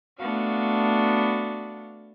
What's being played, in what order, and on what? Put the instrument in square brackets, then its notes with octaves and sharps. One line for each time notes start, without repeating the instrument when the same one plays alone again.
[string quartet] A3 B3 D4 F#4 F5